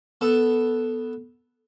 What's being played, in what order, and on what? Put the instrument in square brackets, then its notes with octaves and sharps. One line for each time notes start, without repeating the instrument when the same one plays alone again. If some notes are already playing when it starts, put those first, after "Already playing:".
[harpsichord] B3 A4